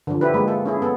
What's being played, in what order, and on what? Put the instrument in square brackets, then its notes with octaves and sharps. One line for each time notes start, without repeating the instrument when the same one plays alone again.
[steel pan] D3 F3
E4 G4 B4
G#3 A#3
A4
C#4 E4 G#4
B3 A4